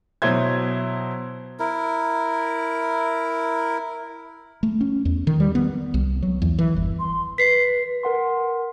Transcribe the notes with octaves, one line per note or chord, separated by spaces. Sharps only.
B2 F#3 E4 C5 G#6
E4 A#4
A3
C#4
E2
D#3
G3
B3
C2
F#3
E2
E3
G1
C6
B4 B6 C7
A#4 F#5 C6